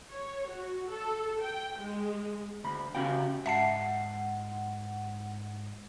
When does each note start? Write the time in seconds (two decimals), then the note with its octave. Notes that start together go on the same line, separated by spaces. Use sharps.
0.10 C#5
0.49 F#4
0.90 A4
1.40 G5
1.79 G#3
2.64 D2 B5
2.95 C#3 C#4 F#4 G4 F5 G5
3.46 G#2 E5 F#5 A5 C7